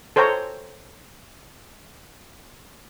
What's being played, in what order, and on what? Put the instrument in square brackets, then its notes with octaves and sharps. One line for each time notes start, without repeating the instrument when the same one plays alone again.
[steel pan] A4 C5 C#5 G5 A#5